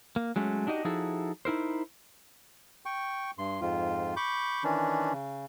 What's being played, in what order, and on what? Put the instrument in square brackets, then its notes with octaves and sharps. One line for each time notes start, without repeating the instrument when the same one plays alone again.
[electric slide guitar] A#3
F#3 G#3 A3 C#4
D4 D#4 F#4 G4 D#5
F3 D#4 E4 F#4 G#4 A4
D#4 E4 A#4 C5
[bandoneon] G5 C#6
G2 C6
F2 G#2 F4
B5 C#6 D6 G6
D#3 E3 C#4 D4
C#3